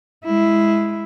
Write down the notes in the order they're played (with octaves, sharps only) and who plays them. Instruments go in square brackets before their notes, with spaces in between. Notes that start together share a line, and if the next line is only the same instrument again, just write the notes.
[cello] G#3 E4